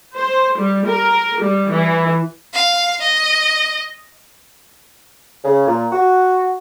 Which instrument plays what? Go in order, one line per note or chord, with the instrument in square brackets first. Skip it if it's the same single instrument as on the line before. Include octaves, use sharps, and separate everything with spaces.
[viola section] C5
G3
A#4
G3
E3
[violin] F5
D#5
[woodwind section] C#3
A#2
F#4